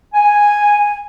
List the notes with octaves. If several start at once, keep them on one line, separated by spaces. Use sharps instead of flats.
G#5